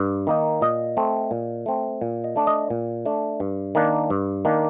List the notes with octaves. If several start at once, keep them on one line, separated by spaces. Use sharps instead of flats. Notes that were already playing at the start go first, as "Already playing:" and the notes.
Already playing: G2
D#3 A#3 D#4
A#2 D#5
A3 C4
A#2
A3 C4
A#2
D#5
A3 D4
D#5
A#2
A3 D4
G2
D#3 A#3 D4
G2
D#3 A#3 D4